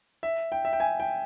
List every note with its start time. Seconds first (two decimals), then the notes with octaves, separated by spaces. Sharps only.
0.23 E5
0.52 G5
0.65 E5
0.73 G5
0.80 G#5
1.00 G5